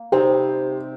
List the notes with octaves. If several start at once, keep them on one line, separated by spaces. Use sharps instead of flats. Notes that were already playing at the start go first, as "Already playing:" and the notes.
Already playing: A#3
C3 G3 C4 D#4 G4 C5